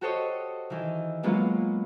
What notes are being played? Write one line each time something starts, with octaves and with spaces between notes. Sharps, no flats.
F#4 G4 A4 C5 C#5 D#5
D#3 E3
F#3 G#3 A#3 B3 C#4 F4